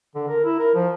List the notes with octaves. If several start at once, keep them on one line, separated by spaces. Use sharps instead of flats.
D3
A#4
E4
A#4
F3